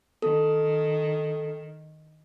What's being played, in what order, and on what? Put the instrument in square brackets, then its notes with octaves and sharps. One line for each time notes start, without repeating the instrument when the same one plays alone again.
[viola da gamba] D#3 [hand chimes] A4